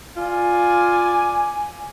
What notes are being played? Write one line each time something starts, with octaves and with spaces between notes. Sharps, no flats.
F4 D5 G#5